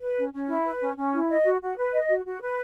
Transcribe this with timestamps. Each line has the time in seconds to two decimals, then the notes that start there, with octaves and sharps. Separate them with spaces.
0.01 B4
0.17 C#4
0.33 C#4
0.48 E4
0.65 B4
0.81 C#4
0.97 C#4
1.14 E4
1.29 D#5
1.45 F#4
1.61 F#4
1.77 B4
1.94 D#5
2.09 F#4
2.25 F#4
2.42 B4